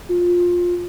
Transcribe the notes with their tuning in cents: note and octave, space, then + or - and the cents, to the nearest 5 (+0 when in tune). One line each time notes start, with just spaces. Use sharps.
F4 +15